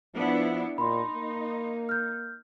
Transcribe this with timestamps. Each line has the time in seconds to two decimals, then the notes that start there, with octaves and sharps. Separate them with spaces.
0.14 F3 B3 D4 E4
0.78 A#2 D#4 B5 C6
1.14 A#3
1.89 F6 G6